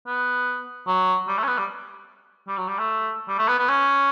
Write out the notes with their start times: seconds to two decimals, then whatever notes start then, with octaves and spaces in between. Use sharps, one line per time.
0.07 B3
0.87 F#3
1.28 G3
1.38 A3
1.43 C#4
1.47 B3
1.58 G3
2.48 G3
2.57 F#3
2.68 G3
2.78 A3
3.28 G3
3.38 A3
3.48 B3
3.59 B3
3.68 C#4